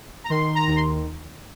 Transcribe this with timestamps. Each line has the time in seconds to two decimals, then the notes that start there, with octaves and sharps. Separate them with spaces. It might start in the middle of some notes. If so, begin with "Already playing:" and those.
0.24 A#5
0.30 D#3 C6
0.55 A#5
0.67 D#2
0.76 C6